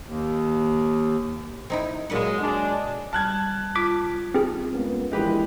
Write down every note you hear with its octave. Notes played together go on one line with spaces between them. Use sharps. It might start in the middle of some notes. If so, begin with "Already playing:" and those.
D#2
C4 D#4 E4
A#2 F#3 G#3 B4 F#5
F#3 G#3 D4
G3 A5 F6 F#6 G#6
F4 D6 B6
C4 G#4
C#2 A#3 B3
A#1 E3 G#3 G4 B4